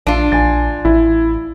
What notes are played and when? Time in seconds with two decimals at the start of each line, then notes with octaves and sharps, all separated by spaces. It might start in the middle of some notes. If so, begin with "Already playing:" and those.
0.07 A#1 D4 F4 D#7
0.32 A#1 G#5 A6
0.85 A1 E4